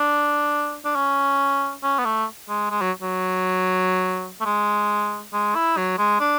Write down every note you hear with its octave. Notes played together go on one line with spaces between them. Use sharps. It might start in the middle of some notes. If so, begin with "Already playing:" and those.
Already playing: D4
D4
C#4
C#4
B3
A3
G#3
G#3
F#3
F#3
A3
G#3
G#3
E4
F#3
G#3
D4